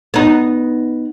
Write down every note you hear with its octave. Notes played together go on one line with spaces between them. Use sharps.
B3 D#4